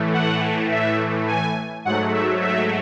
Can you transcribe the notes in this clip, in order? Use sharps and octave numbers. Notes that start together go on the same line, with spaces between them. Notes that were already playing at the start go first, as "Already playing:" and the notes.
Already playing: A2 E3 A3
F#5
E5
G#5
G#2 F#3 A3 F#5
E5
E5